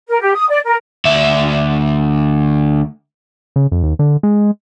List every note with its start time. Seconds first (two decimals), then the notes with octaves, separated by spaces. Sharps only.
0.08 A#4
0.20 G4
0.34 D#6
0.48 D5
0.65 A#4
1.05 D2 E5
3.56 C#3
3.72 F2
3.83 D#2
3.99 D3
4.23 G#3